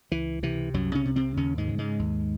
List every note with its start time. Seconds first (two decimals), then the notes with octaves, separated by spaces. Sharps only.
0.12 C#2 E3
0.43 C3 E3
0.74 C2 F#2 F#3
0.95 C#3 C#4
1.05 C3
1.16 C3 C4
1.37 D#2 C#3 C#4
1.58 G#2 G#3
1.68 C#3
1.78 G#2 G#3
1.99 D#2